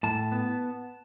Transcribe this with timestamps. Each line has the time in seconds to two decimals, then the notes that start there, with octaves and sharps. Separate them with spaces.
0.03 A2 A5
0.32 B3